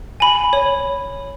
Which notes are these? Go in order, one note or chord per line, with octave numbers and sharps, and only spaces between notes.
G#5 B5
C#5